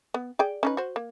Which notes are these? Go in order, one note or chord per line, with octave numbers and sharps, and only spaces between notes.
B3
G#4 D5 G5
C#4 D#4 B4
F#4 C5
A#3